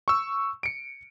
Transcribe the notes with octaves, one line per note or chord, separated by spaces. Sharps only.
C#6 E6
C#7 D7